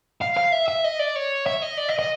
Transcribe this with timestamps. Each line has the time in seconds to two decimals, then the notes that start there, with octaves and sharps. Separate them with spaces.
0.21 F5
0.37 F5
0.52 E5
0.68 E5
0.84 D#5
0.99 D5
1.16 C#5
1.46 E5
1.62 D#5
1.78 D5
1.89 D#5
1.99 D#5